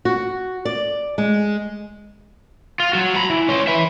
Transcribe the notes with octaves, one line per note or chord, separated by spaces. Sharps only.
F#4
D5
G#3
F4
F#3 F#4
A#5 B5
E3
C#4 C6
B4 E5